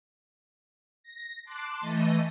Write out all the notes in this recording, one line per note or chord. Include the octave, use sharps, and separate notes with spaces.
A#6
A5 C6 D6 F#6
E3 A3 D#5 A6